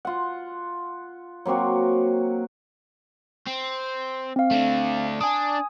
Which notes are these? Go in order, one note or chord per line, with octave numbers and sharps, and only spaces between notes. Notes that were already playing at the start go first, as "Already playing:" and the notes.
F4 F#5
F#3 A#3 C4 F#4
C4
C4 F5
A3 D4
D4 G#5 D#6